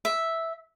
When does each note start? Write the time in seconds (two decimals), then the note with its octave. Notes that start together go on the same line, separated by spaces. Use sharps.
0.05 E5